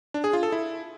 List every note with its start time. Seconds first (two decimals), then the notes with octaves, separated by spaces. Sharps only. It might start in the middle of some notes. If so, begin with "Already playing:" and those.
0.14 D4
0.24 G#4
0.33 F4
0.43 A4
0.52 E4